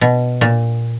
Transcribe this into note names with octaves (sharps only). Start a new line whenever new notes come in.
B2
A#2